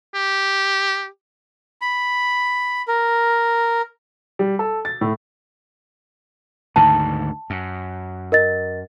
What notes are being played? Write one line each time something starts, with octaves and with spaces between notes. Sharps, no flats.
G4
B5
A#4
G3
A4
A6
A2
D2 G#2 D#3 A5
F#2
A#4 D#5 A6